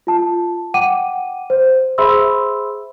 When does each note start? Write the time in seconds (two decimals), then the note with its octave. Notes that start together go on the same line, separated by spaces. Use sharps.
0.07 F4 A5
0.74 F#5 G5 D6 D#7
1.50 C5
1.98 G#4 C5 E5 B5 C6 E6